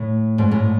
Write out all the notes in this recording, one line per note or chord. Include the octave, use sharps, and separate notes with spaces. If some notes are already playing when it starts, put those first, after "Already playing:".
Already playing: A2
G#2
A2